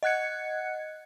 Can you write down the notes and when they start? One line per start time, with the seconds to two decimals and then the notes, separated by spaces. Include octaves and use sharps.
0.03 D#5 F#5 F#6 G#6 C#7